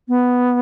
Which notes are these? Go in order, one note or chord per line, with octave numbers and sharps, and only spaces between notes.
B3